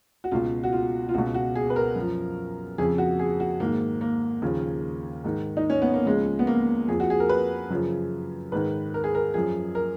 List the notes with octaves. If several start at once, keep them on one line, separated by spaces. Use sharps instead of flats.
F#4
C#2 B2 F4
F#4
F4
F4
C#2 B2 F#4
F#4
G#4
B4
A#4
F#2 F3
F2 C#3 F3 G#4
F#4
G#4
F#4
G#2 D#3 A#3
A#3
D#2 C#3 F3
G#2 D#3
D#4
C#4
B3
A#3
C#2 C#3 F3 G#3
B3
A#3
F2 F3 G#4
F#4
G#4
A#4
B4
F#2 C#3 F3
G#2 D#3 B4
A#4
G#4
A#4
F#2 F3 G#4
A#4